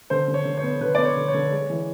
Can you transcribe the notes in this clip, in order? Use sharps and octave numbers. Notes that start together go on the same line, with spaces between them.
D3 C5
D3
C#5
D3
C#5
B3
D3 B4
B3 D5
C#5
D3
C#5
D3
G#3
E3